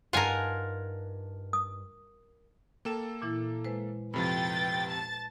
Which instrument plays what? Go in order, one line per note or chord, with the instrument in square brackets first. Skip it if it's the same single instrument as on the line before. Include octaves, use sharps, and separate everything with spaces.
[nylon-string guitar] G2 D#4 A5 [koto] F4 A#4 [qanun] F#5 G#5
[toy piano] D#6
[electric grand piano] A#3 A4 E7 [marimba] G5 A5
[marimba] A#2 E3 E4
G#3 B4 C5
[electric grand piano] F2 C3 F3 [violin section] B4 G5 A6 [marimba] B5
[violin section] A5 A6